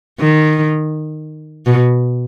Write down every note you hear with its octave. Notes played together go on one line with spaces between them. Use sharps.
D#3
B2